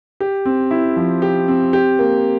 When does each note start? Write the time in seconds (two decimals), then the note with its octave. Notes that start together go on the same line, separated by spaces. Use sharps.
0.20 G4
0.45 C4
0.71 E4
0.96 F3
1.22 G4
1.48 C4
1.73 G4
1.99 A#3